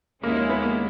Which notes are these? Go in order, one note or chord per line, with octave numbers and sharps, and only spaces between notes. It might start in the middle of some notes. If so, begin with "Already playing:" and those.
D#2 D#3 G#3 A#3 C#4 E4
A#3
B3
A#3